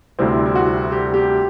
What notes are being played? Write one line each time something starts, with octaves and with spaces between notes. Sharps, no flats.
D2 C3 G3 C4 E4
E4
F#4
G4
G4